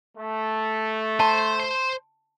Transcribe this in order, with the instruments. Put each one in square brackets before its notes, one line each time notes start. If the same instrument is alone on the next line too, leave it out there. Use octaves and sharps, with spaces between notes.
[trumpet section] A3
[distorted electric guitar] C5 C6 [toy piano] A5